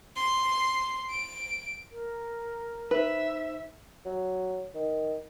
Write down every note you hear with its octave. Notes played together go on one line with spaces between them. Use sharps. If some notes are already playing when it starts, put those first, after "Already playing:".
C6
D7
A#4
D#4 B4 C5 E5
F#3
D#3